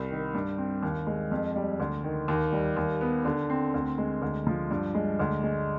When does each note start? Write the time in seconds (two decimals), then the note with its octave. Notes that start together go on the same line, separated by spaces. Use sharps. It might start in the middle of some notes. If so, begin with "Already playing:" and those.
Already playing: C2
0.10 D#3
0.34 G2
0.58 C4
0.83 D#2
1.07 G#3
1.31 F2
1.56 G3
1.80 D2
2.04 D#3
2.28 D#2
2.52 G3
2.77 D#2
3.01 B3
3.25 D3
3.50 C4
3.74 D2
3.98 G#3
4.22 D2
4.47 F3
4.71 G2
4.95 G#3
5.19 D2
5.44 G#3